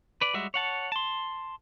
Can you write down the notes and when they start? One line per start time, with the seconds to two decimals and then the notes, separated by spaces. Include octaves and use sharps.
0.21 B4 D5
0.34 G3 G#3 F#4 E5
0.54 C#5 F#5 A5
0.92 A5 C6